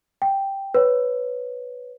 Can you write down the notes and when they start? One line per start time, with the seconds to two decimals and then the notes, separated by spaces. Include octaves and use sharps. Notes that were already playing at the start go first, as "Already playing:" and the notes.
0.22 G5
0.74 B4 C#5